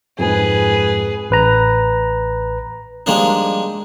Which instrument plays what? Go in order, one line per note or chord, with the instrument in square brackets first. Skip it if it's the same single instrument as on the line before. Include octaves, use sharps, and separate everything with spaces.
[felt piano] F2 G#2 [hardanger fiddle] G#4 B4
[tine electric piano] A1 B4 A#5
[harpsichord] F3 G3 G#3 A#3 D4 D#4